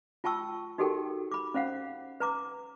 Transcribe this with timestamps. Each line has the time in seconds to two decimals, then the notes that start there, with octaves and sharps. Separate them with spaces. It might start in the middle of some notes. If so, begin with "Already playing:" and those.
0.24 F4 G5 A5 C#6 E6
0.78 D#4 F#4 G4 A4 A#4 G5
1.31 B5 D6
1.54 C#4 C5 F5 F#5
2.20 B4 A#5 D6